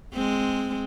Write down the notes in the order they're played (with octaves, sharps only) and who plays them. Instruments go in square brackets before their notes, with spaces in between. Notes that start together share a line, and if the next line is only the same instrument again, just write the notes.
[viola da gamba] G#3 C4